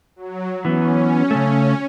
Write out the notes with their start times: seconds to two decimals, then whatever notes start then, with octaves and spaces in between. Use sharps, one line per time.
0.16 F#3
0.65 E3 B3 C#4
1.31 C#3 A3